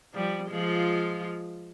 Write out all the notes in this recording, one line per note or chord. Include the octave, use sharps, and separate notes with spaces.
F3 G3
F3 G#3 F4